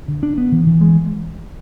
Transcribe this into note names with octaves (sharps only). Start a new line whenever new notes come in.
D3
D4
B3
E3
E3
G#3